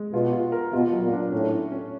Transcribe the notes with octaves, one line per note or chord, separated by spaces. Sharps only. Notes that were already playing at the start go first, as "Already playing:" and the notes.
Already playing: G#3
B2 F4
F4
A#4
B2 F4
F#3
A#2
D4
A2 C#4
C#4
C#4